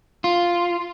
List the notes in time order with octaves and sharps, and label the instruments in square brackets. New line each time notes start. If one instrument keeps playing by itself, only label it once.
[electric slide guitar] F4